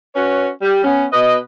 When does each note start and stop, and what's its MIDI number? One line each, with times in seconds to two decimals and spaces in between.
0.16 0.49 61
0.16 0.49 66
0.16 0.49 71
0.16 0.49 73
0.62 0.83 55
0.84 1.06 59
0.84 1.06 61
1.13 1.38 47
1.13 1.38 71
1.13 1.38 75